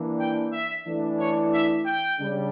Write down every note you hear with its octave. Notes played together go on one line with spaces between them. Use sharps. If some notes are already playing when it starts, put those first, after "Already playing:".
Already playing: E3 A#3 D4
G5
E5
E3 A3 D4
C#5
E5
G5
C#3 G3 D4